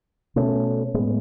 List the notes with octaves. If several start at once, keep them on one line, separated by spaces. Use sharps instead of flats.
B2 A3 C#4
A2 G#3 B3